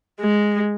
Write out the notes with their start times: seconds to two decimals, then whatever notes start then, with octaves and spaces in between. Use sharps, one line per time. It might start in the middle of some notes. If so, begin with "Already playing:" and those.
0.20 G#3